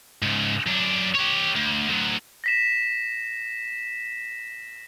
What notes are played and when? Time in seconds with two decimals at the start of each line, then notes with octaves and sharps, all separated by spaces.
0.22 G#2 C#3
0.67 F#2 D4
1.15 G4 C#5
1.56 D2
1.89 D2 F#3
2.44 A#6 B6 E7